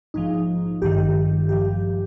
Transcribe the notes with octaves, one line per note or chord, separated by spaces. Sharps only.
A#1 G#2 F3 D#4
G#1 G2 D#3 G4
G#1 G2 F3 G4